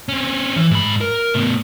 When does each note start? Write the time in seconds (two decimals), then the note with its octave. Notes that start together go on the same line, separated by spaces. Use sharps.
0.09 C4 C#4
0.56 E3
0.71 G#2 B5
1.01 A#4
1.34 A2 B3